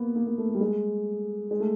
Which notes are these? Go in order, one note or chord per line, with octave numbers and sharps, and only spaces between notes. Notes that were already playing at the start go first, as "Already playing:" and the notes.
Already playing: A#3 B3
A#3
A#3
A3
A3
G3
G#3
G#3
A3